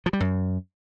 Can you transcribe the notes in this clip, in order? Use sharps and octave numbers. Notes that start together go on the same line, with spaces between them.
F3
G3
F#2